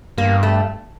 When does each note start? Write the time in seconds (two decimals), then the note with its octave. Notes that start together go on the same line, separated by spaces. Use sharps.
0.18 G2 A#3
0.43 A3